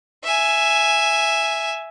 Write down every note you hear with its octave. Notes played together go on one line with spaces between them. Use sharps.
E5 G#5